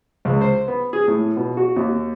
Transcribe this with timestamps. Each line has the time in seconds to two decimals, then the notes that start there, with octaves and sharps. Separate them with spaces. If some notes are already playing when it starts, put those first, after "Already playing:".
0.25 C#2
0.41 C5
0.68 B3
0.93 G#4
1.08 A2
1.36 B2
1.57 F#4
1.76 D#2